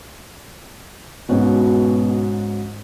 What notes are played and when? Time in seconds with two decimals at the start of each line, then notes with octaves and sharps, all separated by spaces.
1.29 G#2 B2 C#4 F#4